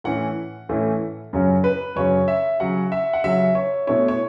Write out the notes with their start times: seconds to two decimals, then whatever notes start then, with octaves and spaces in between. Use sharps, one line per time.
0.04 A2 E3 A3 C#4 E4 F#5
0.69 A2 E3 A3 C#4 E4
1.33 F#2 C#3 F#3 C#4
1.64 B4
1.96 F#2 C#3 F#3 C#4 C#5
2.28 E5
2.60 C#3 F#3 C#4 F#5
2.92 E5
3.13 F#5
3.24 C#3 F#3 C#4 E5
3.55 C#5
3.87 B2 A3 E4 C#5
4.08 C#5